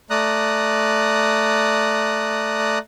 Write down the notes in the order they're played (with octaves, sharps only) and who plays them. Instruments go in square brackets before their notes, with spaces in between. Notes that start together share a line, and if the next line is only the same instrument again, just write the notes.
[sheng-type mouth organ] A3 D5 A#5 D#6 F#6